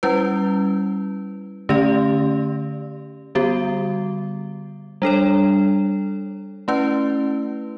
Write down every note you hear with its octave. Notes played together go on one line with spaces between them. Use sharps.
G3 C#4 E4 B4
D3 A3 C#4 G4 D5
D3 G3 B3 F#4
G3 D4 A4 C#5
A3 C#4 E4 B4